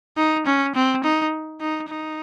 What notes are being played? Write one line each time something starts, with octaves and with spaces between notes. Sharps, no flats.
D#4
C#4
C4
D#4
D#4
D#4